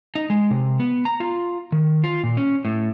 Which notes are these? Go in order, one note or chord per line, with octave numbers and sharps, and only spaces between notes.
D#4
G#3
C3
B3
A#5
F4
D#3
F4
A#2
C#4
A2